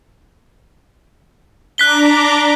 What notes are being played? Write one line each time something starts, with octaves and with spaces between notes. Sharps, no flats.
D4 A#5 D6 F#6 B6 G7